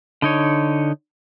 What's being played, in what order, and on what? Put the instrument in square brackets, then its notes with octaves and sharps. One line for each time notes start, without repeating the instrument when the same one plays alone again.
[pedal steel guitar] D3 D#4 C#5